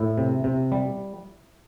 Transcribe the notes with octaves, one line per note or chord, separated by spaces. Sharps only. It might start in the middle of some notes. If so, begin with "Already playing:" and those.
Already playing: A2 E4
C3
C3
G3